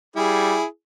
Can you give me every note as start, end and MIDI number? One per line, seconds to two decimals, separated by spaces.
0.16 0.58 55
0.16 0.65 64
0.16 0.65 68